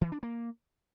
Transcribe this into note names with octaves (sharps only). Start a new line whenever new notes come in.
E3
D4
A#3